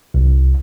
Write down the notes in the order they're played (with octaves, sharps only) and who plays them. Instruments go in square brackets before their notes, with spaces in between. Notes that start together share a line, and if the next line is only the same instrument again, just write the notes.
[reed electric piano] C2